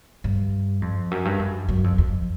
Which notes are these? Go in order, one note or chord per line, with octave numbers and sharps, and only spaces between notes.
G2
F2
F#2
G2
F#2
F#2
F2
F2